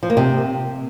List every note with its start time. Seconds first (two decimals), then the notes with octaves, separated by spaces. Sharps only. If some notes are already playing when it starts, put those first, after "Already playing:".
0.03 F3
0.10 A#3
0.17 C3